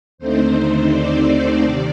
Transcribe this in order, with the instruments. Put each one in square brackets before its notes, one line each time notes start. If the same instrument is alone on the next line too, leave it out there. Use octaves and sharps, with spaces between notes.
[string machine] D#2 D3 A3 C4 D#4 C5
D5
C3 D#3 D5